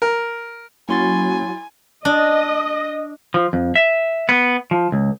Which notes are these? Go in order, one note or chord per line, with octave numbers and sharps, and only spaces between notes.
A#4
F#3 A#3 C#4 E4 F#4 G#5 C6 A6
D4 D#5
F3
F2
E5
B3
F3
C#2